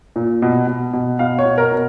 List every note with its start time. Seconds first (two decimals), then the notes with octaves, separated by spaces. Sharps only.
0.16 A#2
0.42 B2
0.67 B2
0.93 B2
1.19 B2 F5
1.39 C#5
1.45 B2
1.58 A#4
1.72 B2